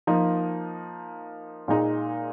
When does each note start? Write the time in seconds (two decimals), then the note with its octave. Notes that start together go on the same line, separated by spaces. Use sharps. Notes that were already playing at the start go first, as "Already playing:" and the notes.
0.07 F3 A#3 D#4
1.68 A#2 G#3 D#4